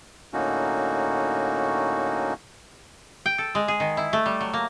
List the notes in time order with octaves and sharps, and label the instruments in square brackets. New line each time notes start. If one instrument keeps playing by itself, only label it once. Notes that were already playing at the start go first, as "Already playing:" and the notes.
[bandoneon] A2 D3 A#3 C#4 D#4 F#4
[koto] G5
A4
G#3
G#4
D#3
E4
A3
G3
F#3
A#3